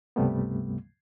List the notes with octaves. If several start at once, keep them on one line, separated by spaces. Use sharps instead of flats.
C#2 G2 C3 G3 A3 B3